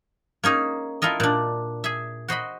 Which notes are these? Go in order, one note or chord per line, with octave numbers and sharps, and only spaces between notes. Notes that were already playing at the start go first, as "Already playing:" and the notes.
A#3 C#4 D#4 G#4
E4 F4 A4 A#4 D#5
A#2 D4
G#4 E5
F#4 C5 D#5 B5